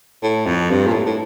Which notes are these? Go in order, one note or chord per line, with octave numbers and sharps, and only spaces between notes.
A2
F2
G2
A#2
A2
A2